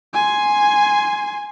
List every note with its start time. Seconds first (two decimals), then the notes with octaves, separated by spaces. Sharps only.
0.14 G#5 C6